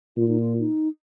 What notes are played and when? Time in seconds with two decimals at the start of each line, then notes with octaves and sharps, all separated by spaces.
0.17 A#2 F4
0.28 D#4
0.40 F4
0.59 D#4